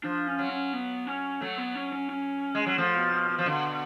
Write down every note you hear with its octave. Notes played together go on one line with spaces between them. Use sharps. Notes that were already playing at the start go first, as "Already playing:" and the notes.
F3 D4
C#4
F#3
C#4
B3
C#4
F#3 A3
B3
C#4
C#4
C#4
G#3
F#3
F3 A3
B2
B2
B2
F3
B2 D3